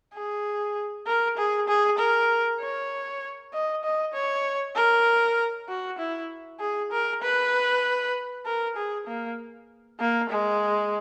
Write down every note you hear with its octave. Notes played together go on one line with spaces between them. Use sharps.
G#4
A#4
G#4
G#4
A#4
C#5
D#5
D#5
C#5
A#4
F#4
E4
G#4
A#4
B4
A#4
G#4
A#3
A#3
G#3